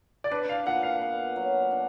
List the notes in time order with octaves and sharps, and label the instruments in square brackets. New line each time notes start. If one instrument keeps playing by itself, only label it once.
[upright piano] D5
[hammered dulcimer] D4 [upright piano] B4
[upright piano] F5
[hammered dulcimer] A#2 [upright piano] F#5
[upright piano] F5
[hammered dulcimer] B3
F#3
D4